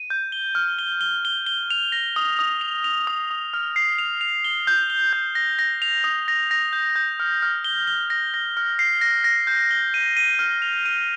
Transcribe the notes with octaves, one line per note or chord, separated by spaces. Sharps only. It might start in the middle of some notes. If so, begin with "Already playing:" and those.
Already playing: D#7
G6
G7
F6
G7
G7
G7
G7
F7
A#6
D#6
D#6
F7
F7
D#6
D#6
F6
C7
F7
F7
G7
G6
G7
G6
A#6
A#6
F7
D#6
A#6
A#6
G6
G6
F6
F6
G7
G7
A#6
A#6
F6
C7
A#6
A#6
G6
G7
D#7
D#7
F6
F7
D#7